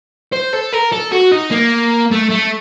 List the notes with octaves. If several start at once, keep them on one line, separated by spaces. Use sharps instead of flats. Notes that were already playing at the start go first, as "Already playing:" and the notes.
C5
A4
A#4
A4
F#4
D#4
A#3
A3
A3